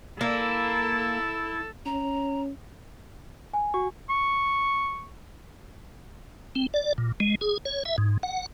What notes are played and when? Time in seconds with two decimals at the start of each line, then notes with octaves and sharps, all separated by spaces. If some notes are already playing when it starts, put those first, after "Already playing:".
0.21 A#3 E4 A4
1.86 C#4 A#5
3.54 G#5
3.74 F#4 C#6
4.10 C#6
6.55 C4
6.74 D5
6.98 A#2
7.20 G#3
7.41 G#4
7.65 C#5
7.85 E5
7.98 G#2
8.23 F#5